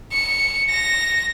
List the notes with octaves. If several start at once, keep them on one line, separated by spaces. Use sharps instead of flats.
C#7
A#6